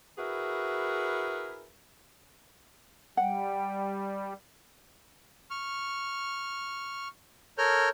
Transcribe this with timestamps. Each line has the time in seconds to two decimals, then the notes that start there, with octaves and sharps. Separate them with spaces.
0.18 E4 F#4 G#4 A#4 B4 E5
3.17 G3 F#5 G5
5.50 C#6 F6
7.58 A4 A#4 C#5 F6 G6